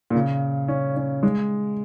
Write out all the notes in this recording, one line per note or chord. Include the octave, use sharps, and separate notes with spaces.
A#2
C#3
C#4
C#4
G#3